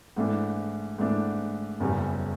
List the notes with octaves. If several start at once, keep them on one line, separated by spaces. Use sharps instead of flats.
G#2 E3 A3 D4
G#2 E3 A3 D4
F#1 E2 C#3 E3 G3